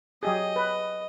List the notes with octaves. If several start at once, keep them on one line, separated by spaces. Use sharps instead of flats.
F#3 G4 G#4 D#5
B4